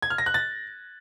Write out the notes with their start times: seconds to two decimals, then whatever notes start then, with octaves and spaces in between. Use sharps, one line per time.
0.02 G#6
0.10 F6
0.18 A#6
0.26 F#6
0.34 A6